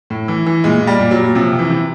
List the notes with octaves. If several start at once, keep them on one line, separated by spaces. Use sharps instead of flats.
A2
E3
E3
A#2 G#3
A#2
G3
A#2
F#3
A#2
C3 F3
C3
E3
C3